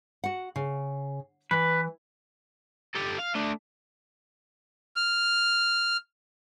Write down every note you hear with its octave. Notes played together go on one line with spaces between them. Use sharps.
F#4 F#5
C#3
E3 B4
G4 A4
F5
A3 D4
F6